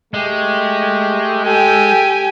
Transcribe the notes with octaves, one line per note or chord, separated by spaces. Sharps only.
G#3 A3 G4
G4 A4 G5 G#5